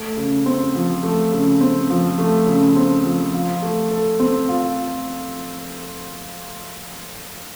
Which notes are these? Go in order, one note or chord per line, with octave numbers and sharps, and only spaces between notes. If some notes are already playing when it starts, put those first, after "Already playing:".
Already playing: A3
C#3
C4
F3
A3
C#3
C4
F3
A3
C#3
C4
F3
F4
A3
A4
C4
F4